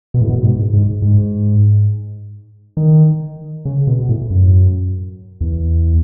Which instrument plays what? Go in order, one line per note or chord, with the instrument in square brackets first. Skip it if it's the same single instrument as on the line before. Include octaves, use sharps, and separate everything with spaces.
[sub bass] B2
A2
B2
G#2
G#2
G#2
D#3
C#3
B2
A2
F#2
E2